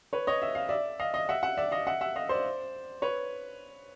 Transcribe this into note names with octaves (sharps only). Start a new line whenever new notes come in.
B4 C#5
C#5 D#5
E5
F5
D5 E5
D#5 F5
D#5 F5
E5 F#5
E5 F#5
D5 E5
D#5 F5
E5 F#5
E5 F#5
D#5 F5
C5 D5
B4 C#5